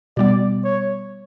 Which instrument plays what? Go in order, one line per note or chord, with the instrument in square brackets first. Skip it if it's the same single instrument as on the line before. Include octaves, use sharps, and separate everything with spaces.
[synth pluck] B2 G3 B3 [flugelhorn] D5
[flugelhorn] C#5